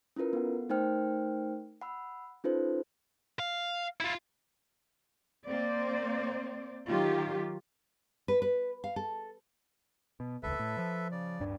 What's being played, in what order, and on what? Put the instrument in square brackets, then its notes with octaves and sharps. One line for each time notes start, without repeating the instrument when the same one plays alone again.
[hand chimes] C#4 E4 F4 A#4 B4
B3 A4 F#5
A3 D#4 A#4 C5 G5 F6
F#5 B5 E6
C#4 D#4 F4 A4 B4 C5
[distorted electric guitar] F5
E4 F4
[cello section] A#3 C4 C5 D5
D#3 F#3 F4 G4
[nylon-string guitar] B4
B4
F5
A4
[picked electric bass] B2
[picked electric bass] E1 C#2 [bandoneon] A4 B4 E5
[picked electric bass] A2
F3
[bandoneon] C#3 D5
[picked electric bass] D1 G2 D4